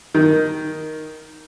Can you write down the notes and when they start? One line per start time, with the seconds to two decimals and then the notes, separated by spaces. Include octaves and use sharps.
0.15 D#3